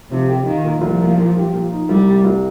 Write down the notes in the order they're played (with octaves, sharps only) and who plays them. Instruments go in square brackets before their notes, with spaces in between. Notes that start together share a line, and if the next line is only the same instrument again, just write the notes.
[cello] C3 [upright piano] F3
[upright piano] G4
[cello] D#3 [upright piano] F4
[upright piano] A#2
[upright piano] C2 [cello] F3
[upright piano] A#3
A#2
G3
A#2
D#4
[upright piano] C2 [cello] G3
[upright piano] C3
C2